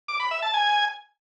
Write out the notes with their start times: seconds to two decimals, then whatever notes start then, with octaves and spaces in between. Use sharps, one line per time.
0.08 D6
0.20 B5
0.31 E5
0.42 A5
0.54 G#5